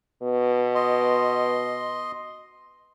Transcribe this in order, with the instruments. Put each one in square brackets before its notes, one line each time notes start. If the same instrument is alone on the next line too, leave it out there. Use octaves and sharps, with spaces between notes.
[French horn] B2
[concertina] D#5 C6